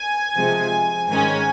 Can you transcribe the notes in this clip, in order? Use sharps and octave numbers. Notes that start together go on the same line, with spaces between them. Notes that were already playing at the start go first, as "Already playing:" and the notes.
Already playing: G#5
C3 F3 G#3
G#2 D#3 G#3 C#4 G#5